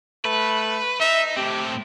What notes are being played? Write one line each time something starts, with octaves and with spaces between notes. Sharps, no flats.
A3 B4
D#4 E5
A2 C4 G4